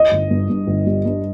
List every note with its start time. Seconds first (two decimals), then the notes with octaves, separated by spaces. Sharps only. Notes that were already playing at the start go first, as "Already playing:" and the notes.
Already playing: D#5
0.12 G1
0.31 G2
0.50 G2
0.67 G1
0.86 G3
1.06 G2